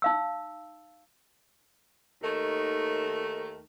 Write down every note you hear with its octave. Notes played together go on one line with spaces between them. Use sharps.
D#4 F5 E6
D#2 D#3 A3